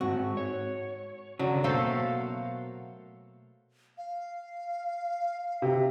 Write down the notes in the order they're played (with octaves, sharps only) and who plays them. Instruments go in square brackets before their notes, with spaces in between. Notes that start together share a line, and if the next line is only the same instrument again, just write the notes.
[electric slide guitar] G#2 C4 [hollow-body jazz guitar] F#4
[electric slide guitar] C#5
[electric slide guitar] C#3 C#4 D4 [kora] F#3
[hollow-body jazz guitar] B2 A#3 [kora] A3 A4 C5 [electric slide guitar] F5 F#5
[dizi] F5
[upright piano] C3